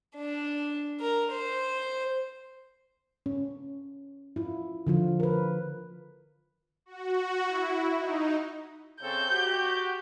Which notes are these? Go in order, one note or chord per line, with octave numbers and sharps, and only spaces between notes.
D4
A#4
C5
C#4
E4 F4
D3 F3 F4
A#4 B4
F#4
E4
D#4
C#3 C4 A4 G6
F#4 G4